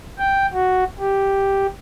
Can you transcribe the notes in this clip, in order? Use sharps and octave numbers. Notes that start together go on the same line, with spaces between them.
G5
F#4
G4